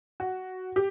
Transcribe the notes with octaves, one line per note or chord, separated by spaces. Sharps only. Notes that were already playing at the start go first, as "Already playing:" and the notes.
F#4
G4